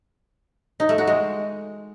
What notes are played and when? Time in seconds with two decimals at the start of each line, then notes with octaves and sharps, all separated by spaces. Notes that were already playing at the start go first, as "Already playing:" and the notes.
0.80 D#4
0.89 A3
0.98 F#4
1.07 G#3